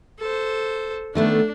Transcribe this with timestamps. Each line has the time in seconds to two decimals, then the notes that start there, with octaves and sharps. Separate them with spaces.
0.19 A4 C5
1.15 D#3 A3 B3 D4